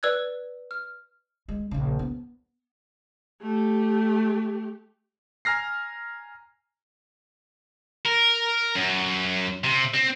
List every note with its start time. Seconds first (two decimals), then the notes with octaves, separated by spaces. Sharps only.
0.03 B4 D5 E6 F#6 G#6
0.71 F6
1.48 G#3
1.71 A#1 C#3
1.99 B3
3.42 A3 G4
5.45 G#5 A#5 F6 A#6 C7
8.05 A#4
8.75 F#2
9.64 C3
9.94 C4